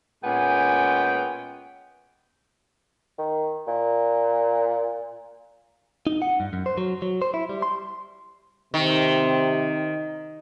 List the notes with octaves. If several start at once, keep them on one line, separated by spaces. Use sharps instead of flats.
A#2 G#3 B3 C#4 G5 G#5
D#3
A#2
D#4
F#5
G2
F#2
C5
F#3
F#3
C5
E4
G3
C6
C3 D#3